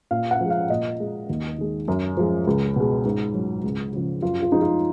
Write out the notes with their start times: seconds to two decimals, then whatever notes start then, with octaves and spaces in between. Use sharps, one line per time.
0.11 A#2 F5
0.31 F#5
0.41 F3 G#3
0.50 F5
0.70 A#2 D#5
1.00 G#3
1.29 D#2
1.58 D#3 G#3
1.88 F#2
2.17 F3 G#3
2.47 C#2
2.76 B2 G#3
3.05 G#2
3.34 F#3
3.63 C#2
3.93 C#3 F3
4.22 F#2 F4
4.42 F4
4.52 F3 G#3 D#4
4.62 F4